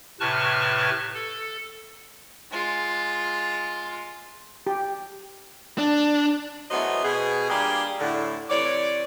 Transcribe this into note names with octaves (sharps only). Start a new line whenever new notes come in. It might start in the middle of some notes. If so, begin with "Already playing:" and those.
A2 C3 B4 A5 C#6 F6
A4
G#3 F4
G4
D4
E2 F#3 A3 B3 C5 D#5
B2 G#4
G3 A#3 D4 F4 G4 G#4
A2 D3
C3 E3 C#5 D5